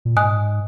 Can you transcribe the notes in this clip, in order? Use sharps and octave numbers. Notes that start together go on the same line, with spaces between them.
A#2
G#2 D#5 G#5 D#6 F#6